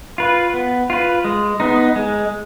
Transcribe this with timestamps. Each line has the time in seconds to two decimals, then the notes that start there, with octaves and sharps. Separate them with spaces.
0.18 F4 B4
0.54 B3
0.90 F4 B4
1.25 G#3
1.60 B3 D#4
1.96 G#3